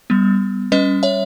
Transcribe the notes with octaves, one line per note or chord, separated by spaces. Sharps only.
G3 B3
G3 C#4 B4 D#5
C#5 E5